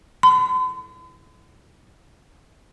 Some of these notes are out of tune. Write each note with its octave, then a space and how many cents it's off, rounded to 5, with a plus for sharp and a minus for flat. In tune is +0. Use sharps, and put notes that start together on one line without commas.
C6 -45